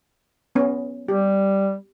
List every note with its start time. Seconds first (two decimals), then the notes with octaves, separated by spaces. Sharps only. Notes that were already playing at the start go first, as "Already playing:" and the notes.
0.55 B3 C#4
1.09 G3 G4